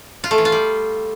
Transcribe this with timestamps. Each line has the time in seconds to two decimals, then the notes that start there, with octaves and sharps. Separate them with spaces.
0.24 F4
0.31 A3
0.38 E3
0.45 F4
0.52 G3